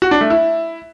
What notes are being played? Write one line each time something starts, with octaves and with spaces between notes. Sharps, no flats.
F#4
D4
A3
E4